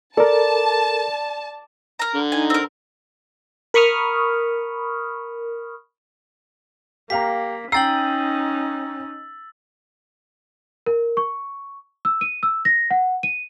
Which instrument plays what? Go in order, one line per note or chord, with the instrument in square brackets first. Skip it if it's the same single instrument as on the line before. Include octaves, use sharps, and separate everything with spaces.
[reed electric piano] A4 A#4 [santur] D5 [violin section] A5
[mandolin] A#4 A#5
[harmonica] D3
[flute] D#4 [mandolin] G#5
[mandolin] C4 A#4
[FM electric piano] A#4 B5 C#6 D#6 F6
[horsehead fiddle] A#3 [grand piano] G4 F5 A#5 [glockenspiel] B6
[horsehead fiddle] C#4 D#4 [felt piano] G5 C7 [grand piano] A#5 [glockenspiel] E6 A6 F#7
[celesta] A#4
C#6
E6
D#7
E6
A#6
F#5
D#7